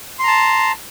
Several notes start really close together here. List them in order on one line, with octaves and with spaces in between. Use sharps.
C6 A#5 A5